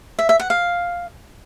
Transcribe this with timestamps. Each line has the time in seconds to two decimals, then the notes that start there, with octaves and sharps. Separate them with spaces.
0.19 E5
0.29 E5
0.40 F#5
0.50 F5